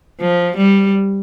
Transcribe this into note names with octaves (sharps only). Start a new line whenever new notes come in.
F3
G3